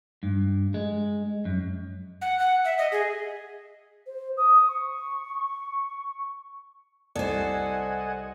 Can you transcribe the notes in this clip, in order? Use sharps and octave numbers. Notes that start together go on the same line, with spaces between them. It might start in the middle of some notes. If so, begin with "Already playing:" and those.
G2
G#3
F#2
F#5
F#5
E5
D#5
G#4
C5
D#6
C#6
C2 A4 C5 D5 D#5 F#5 G#5